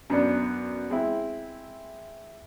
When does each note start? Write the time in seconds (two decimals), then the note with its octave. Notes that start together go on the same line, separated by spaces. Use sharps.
0.10 F#2 B3 D4
0.90 G#3 C4 E4